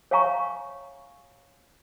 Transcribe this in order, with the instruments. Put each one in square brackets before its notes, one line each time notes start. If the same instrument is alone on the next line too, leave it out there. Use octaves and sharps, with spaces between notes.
[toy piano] C#5 E5 F5 G#5 A#5 C#6